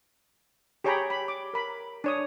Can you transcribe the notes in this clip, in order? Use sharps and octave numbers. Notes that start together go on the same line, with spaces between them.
G4 G#4 C#5 G5 A#5 B5
B5
D6
A#4 B5
D4 C#5 D#6